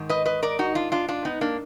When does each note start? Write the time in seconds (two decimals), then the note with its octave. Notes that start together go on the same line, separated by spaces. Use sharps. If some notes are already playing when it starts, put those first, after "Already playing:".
Already playing: G#2 D#3
0.09 B4 D#5
0.26 B4 D#5
0.43 A#4 D5
0.59 D#4 F#4
0.75 D4 F4
0.92 D4 F4
1.09 D4 F4
1.25 B3 D#4
1.41 A#3 D4